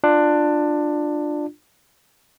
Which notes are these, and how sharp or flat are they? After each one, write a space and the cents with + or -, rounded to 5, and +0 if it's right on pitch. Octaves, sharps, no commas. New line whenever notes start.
D4 +15 F4 +0